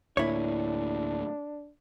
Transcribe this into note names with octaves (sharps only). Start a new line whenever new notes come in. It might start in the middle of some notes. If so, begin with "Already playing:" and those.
D2 A2 A#3 D4 E4 C#5